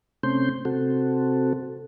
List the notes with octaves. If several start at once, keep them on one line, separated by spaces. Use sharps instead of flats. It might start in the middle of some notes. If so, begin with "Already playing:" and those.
C3 A3 C4 C#4 C6 G6
C3 C4 F#4 A4